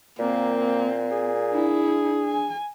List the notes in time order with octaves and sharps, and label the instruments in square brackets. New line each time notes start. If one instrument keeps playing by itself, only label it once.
[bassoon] A#2 [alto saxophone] A#3 [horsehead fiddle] C4
[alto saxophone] G#4
[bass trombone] D4 [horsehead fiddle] E4
[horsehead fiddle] G#5